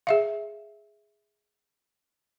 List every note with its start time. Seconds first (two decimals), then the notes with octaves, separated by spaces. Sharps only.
0.07 G#4 E5 F5